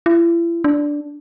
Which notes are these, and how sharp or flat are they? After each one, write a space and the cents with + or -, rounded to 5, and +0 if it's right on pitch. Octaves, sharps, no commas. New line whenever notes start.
E4 +40
D4 -5